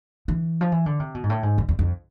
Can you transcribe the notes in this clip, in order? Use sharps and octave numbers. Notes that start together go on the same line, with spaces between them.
E3
F3
E3
D3
C3
B2
G#2
A2
G#2
F2
E2
F2